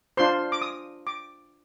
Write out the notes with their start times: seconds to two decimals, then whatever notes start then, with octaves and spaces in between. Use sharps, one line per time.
0.17 D4 F4 C5 C6
0.52 D6
0.62 D#6
1.07 D6